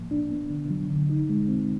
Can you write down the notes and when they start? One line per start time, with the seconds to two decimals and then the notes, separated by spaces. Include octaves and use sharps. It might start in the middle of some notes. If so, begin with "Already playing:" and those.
Already playing: A2 F3 A#3
0.11 D4
0.31 B3
0.50 D3
0.70 F#3
0.90 D3
1.09 D#4
1.29 G#3
1.48 C4